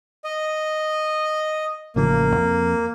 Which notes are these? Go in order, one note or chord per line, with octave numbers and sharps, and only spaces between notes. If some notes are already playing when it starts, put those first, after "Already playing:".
D#5
A1 C#3 F3 A#3
F2